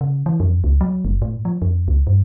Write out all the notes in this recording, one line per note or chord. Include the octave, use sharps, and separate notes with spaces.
C#3
E3
F2
C#2
F#3
F#1
A2
F3
F2
C#2
G2